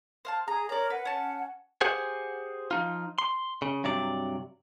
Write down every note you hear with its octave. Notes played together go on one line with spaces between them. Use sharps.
C5 F5 A5
G#4 A#5 D#6
A#4 C#5 D5 A#5
B4 F#5
C#4 A5
G4 G#4 C5 F#5 G#5
F3 D#4 F4
C6
C#3
G2 C3 F#3 D5